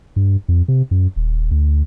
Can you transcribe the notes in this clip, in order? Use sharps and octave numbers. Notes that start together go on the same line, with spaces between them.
G2
F2
C3
F#2
D#1
D2